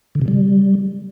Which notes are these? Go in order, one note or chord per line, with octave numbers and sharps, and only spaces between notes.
D3
C3
G3